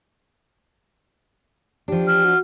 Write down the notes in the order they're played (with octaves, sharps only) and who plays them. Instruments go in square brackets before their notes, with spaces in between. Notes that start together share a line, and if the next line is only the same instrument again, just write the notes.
[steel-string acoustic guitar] F3 D4 [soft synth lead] G4
[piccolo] F6
[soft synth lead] F#4